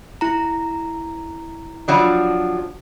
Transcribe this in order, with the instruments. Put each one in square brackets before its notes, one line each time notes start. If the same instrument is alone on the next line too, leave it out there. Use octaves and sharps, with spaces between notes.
[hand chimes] E4 A#5
[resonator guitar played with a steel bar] F3 F#3 D4